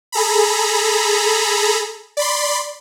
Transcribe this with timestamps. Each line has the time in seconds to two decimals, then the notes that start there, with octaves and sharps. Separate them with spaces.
0.12 G#4 A4 A#5 B5
2.17 D5 B5 C6